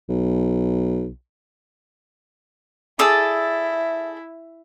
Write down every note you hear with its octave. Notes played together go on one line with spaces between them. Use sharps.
B1
E4 G#4 A4 D5